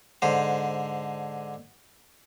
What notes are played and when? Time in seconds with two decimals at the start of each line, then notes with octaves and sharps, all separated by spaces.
0.22 G#2 D3 C5